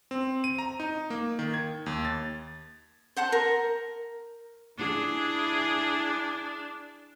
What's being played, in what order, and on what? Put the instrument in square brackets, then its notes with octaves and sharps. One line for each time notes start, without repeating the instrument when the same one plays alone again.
[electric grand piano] C4
D#7
A#5
D#4
A#3
D#3
G#6
D#2
A6
[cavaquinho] C5 F#5 A5 C6
A#4
[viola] D4 [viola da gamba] E4 G#4